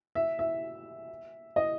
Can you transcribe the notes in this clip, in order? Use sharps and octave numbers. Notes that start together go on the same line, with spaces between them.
E5
E5
D#5